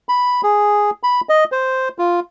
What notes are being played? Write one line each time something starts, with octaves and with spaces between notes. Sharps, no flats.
B5
G#4
B5
D#5
C5
F4